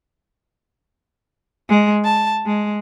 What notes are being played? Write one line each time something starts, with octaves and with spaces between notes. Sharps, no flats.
G#3
A5
G#3